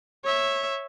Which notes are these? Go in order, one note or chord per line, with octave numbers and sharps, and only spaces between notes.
C#5 E5